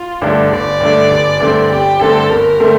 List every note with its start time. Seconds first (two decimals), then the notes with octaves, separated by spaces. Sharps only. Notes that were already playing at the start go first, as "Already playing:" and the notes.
Already playing: F4
0.22 G2 D3 A3 D4
0.51 G1 D5
0.81 G2 D3 A3 D4
1.10 G1
1.40 G2 D3 A3 C4
1.70 G1 G4
2.00 G2 D3 A3 C4 A4
2.29 G1 A#4
2.60 D3 A3 C4